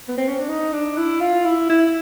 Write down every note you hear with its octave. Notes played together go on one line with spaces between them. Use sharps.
B3
C4
C#4
D4
D#4
D4
E4
F4
E4
E4